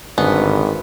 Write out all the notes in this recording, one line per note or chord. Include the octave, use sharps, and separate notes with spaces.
G#1 G2 D3 B3 C#4